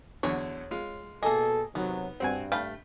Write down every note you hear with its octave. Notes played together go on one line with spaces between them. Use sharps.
E2 D3 F#3 C#5
G#3 F4
B2 A#3 G#4 A4 D#5
C3 D#3 F#3 B3
G2 C4 F#4 G#5
A3 F5 G5 B5